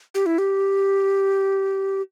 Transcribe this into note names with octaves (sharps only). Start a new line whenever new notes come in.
G4
E4
G4